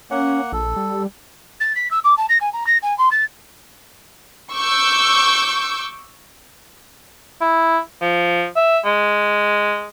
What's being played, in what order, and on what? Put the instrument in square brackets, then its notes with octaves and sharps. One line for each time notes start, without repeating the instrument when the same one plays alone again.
[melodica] A#3 F#5 [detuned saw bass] C#4
[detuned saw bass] A#1 [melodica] A4
[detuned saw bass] G3
[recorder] A6
B6
E6
D6
A5
A#6
G#5
A#5
A#6
G#5
C6
A6
[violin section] C#6 D6 E6 G6
[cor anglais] E4
F3
E5
G#3